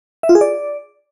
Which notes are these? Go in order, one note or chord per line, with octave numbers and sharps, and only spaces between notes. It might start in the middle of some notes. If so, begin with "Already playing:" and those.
E5
F4
G#4
D5